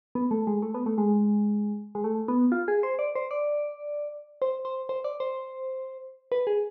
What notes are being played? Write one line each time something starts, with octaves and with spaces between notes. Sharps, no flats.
B3
A3
G#3
A3
B3
A3
G#3
G#3
A3
B3
F4
G#4
C5
D5
C5
D5
C5
C5
C5
D5
C5
B4
G#4